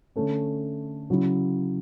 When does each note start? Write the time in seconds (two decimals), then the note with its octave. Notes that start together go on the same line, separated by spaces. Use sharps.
0.16 D3 A3 C#4
1.10 C#3 F#3 C#4 E4